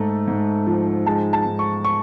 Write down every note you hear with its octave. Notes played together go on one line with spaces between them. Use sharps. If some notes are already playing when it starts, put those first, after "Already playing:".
Already playing: G#2 A3
G#2
F3
G#3 A5
A5
G#2
C#6
C#6